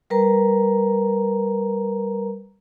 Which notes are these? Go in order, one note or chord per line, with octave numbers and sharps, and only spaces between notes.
G3 A#4 B4 A#5